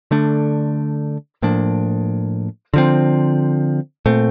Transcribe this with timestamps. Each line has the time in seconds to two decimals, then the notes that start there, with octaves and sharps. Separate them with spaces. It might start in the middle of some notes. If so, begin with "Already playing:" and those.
0.11 D3 A3 D4
1.42 A2 F3 A#3 D4
2.74 D3 F3 C4
4.06 A#2 A3 C4